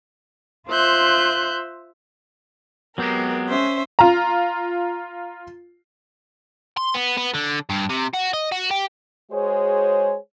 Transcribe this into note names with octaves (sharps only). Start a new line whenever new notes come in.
F4 C5 E5 F#6 G6
F#3 G#3 B3 C4 G4 A#4
C#4 C5 E5
F4 A#5
C6
B3
B3
D3
G2
C3
F#4
D#5
F#4
G4
G#3 F#4 G#4 C5 C#5